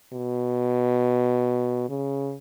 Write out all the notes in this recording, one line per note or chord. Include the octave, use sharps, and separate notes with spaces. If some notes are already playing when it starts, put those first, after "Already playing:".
B2
C#3